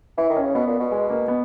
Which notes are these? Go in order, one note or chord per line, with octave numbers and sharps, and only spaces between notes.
E3 E4
D#3
C#4
C#3
B2 B3
A#2
B2
G#3
A#3
B3